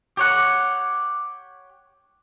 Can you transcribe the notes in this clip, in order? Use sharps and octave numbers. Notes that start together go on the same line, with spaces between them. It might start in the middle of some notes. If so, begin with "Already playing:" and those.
G4 C#5 F#5